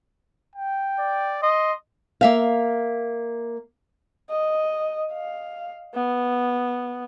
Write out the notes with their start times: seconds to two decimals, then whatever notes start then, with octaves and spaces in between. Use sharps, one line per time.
0.55 G5
0.99 D5
1.43 D#5 C6
2.21 A#3 E5 F5
4.30 D#5
5.13 F5
5.95 B3